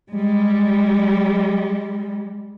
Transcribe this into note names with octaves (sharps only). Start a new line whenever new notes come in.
G3 G#3